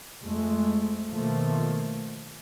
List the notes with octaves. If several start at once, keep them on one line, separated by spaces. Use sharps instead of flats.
F2 G#3 A3
B2 D#3 F3 A3 A#3